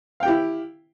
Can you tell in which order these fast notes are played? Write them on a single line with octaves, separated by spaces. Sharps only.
F5 G5 G4 E4